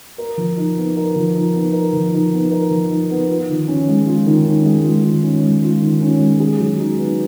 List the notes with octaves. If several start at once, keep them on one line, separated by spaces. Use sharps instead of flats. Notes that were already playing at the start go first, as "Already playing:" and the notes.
A#4
F3
D#4
B3
A#4
F3
D#4
B3
A#4
F3
D#4
B3
A#4
F3
D#4
B3
F4
D#3
C#4
G#3
F4
D#3
C#4
G#3
F4
D#3
C#4
G#3
F4
D#3
C#4
G#3
G#4
F#3
D#4
B3